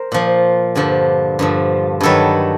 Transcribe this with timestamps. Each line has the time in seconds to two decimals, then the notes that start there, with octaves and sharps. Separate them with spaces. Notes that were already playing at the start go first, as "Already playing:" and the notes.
Already playing: A#4 C5
0.12 A#2 F3
0.75 G2 D3 F3
1.39 G2 D3 F3
2.01 G2 D#3 F#3 A4 B4